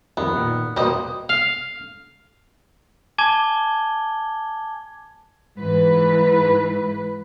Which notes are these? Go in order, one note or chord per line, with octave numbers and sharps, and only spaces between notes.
F2 D#3 G3 B3
A#2 D#3
E2 B2 G3 A#3 C5 D#5
F5
G#5 A5 D6 G#6 G7
G#2 E3 B4